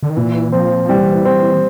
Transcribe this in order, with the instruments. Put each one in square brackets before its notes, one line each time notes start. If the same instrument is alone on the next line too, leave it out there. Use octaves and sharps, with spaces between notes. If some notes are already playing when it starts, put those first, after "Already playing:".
[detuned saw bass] D3
D#3
[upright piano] A#2 [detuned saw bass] E3
[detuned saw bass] F3 [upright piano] C4
[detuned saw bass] F3
[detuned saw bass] E3 [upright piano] G3
[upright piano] C4